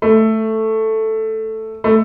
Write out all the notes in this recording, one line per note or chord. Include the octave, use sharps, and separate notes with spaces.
A3
A3